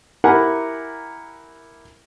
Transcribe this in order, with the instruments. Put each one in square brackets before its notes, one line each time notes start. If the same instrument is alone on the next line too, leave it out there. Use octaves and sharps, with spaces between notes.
[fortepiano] E4 G4 A#4 F#5 G#5 A#5